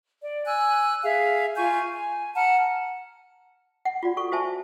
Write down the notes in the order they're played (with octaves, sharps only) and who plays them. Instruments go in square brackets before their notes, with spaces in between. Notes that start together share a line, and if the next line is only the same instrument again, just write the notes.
[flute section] D5
G#5 E6 F#6
G#4 E5 F5
F4 G#5 C#6 G6
G#5
F#5 A5 A#5 F6
[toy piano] F#5
F4 F#4 D5
A4 C#6
F#4 C5 E5 G#5 A5